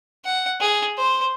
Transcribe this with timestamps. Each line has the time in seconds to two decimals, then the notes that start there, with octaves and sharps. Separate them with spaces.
0.25 F#5
0.60 G#4
0.98 C5